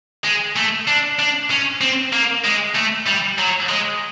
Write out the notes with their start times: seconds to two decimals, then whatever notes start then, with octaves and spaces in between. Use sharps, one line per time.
0.24 G#3
0.56 A3
0.88 D4
1.19 D4
1.50 C#4
1.81 C4
2.13 A#3
2.44 G#3
2.75 A3
3.07 G3
3.39 F#3
3.69 G#3